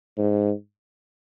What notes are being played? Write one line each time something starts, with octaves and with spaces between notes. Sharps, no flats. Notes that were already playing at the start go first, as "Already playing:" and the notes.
G#2